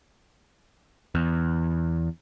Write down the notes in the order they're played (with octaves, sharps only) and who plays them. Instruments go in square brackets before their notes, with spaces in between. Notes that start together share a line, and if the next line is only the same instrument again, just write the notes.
[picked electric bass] E2